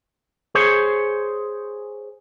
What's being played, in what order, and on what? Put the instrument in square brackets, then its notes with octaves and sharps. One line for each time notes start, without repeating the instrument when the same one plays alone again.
[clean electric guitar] G#4 C5 C#5